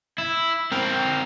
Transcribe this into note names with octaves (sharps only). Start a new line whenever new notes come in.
E4
C4 A#4